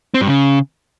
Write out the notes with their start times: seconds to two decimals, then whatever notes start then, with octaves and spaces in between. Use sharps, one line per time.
0.14 C4
0.21 G2
0.27 C#3